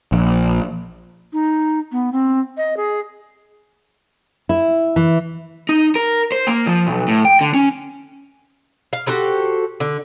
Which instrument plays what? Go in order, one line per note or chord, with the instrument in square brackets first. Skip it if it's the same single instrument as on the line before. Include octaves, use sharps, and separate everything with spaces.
[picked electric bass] A#1
[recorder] D#4
B3
C4
D#5
G#4
[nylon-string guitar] E4
E3
[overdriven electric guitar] D#4
A#4
C5
A#3
F3
B1
A2
G5
D3
C#4
[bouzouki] F5
F#4 G4 A4 C5
D3